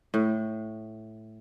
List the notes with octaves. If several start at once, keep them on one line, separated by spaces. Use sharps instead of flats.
A2